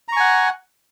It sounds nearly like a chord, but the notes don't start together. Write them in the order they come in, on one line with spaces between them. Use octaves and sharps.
A#5 C#6 G#5 F#5